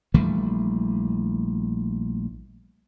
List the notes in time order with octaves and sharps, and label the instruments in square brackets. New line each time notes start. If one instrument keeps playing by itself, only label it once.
[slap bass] A#1 E3 G3 A3